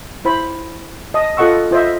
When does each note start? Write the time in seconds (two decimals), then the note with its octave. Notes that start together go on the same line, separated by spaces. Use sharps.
0.25 E4 C5 B5
1.14 D#5 A5 D#6
1.37 F4 A4 D#5 F#5 C#6 E6
1.71 F4 C5 D#5 E5